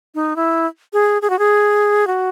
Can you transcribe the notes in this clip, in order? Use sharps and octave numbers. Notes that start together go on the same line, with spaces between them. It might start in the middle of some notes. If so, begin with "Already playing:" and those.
D#4
E4
G#4
G#4
F#4
G#4
F#4